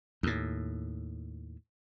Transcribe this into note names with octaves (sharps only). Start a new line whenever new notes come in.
D#2 A2